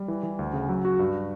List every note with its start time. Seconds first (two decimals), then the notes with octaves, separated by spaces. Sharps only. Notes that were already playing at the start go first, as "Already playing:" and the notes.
Already playing: G3
0.08 E3
0.23 E3
0.39 D2
0.53 C#3
0.69 F#3
0.85 F#4
0.99 G2